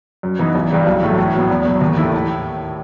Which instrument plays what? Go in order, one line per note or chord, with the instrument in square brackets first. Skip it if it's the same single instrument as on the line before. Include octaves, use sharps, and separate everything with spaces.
[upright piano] F#2
E3 B3 D#4
A1
G2 E3 G3
B1
A2 F#3 A3
A2
F#3 B3
E2
B2 F#3
D#2
D#3 A3 E4
A2